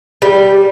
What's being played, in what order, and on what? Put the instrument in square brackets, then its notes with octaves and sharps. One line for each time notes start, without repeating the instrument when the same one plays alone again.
[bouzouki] G3